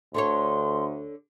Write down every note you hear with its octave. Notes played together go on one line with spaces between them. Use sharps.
D2 D3 A4 C#5 C6